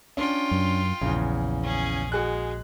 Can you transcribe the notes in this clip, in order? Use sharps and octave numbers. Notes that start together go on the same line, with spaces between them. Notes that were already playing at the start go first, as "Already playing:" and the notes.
C#4 D4 F4 G5
F#2
A#1 E2 C#3
C#4 G#4
G#3 F#4 G#4 F#6